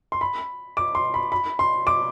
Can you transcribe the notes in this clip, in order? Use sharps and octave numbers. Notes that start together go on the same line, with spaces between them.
C6
B5
D6
C6
B5
B5
C6
D6